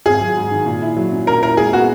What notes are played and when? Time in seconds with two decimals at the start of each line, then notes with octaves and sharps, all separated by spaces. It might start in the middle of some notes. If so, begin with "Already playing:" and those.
0.06 G#1 G#4
0.21 F#3
0.37 G#2
0.51 D#3
0.66 A#2
0.82 E4
0.97 F#3
1.12 C#4
1.27 A#2 A#4
1.42 E4 A#4
1.57 G#3 G#4
1.73 B3 F#4